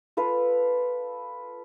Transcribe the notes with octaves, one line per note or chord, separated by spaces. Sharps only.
F4 A4 B4 F5